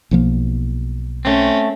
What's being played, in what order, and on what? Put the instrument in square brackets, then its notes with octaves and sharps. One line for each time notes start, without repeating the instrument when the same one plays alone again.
[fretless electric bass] B1 F3 A#3
[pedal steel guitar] A3 C4 [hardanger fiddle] C#4